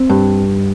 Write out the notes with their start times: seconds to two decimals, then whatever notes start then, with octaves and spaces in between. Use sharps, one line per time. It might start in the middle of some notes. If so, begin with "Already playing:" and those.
Already playing: C4
0.10 G2